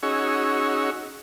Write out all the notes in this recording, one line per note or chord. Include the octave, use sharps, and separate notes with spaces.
C#4 D#4 F#4 G#4 C#6 E6